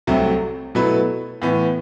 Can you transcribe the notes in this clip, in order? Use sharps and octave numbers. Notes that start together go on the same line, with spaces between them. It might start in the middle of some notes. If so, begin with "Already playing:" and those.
C2 C3 F#3 A3 C4
B2 F#3 A3 E4 B4
A2 E3 B3